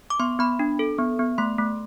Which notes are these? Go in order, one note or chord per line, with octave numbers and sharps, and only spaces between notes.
D6
B3 C6
B3 B5
D4
A4
B3
B3
A3 C6
A3